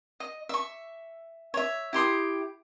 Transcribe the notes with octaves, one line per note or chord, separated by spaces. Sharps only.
D#5
E5 C#6
C#5 E5
E4 G4 C6 D#6